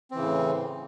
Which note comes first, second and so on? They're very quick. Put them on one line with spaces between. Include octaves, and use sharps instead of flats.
C4 E3 C#3 A2